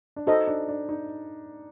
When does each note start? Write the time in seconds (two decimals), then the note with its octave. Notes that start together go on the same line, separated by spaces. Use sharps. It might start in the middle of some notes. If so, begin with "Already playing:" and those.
0.16 D4
0.27 D#4 F#4 A4 C5 D#5
0.47 D4
0.69 D4
0.89 D#4